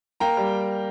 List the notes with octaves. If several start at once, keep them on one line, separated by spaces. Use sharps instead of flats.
A#3 G5 A#5
G3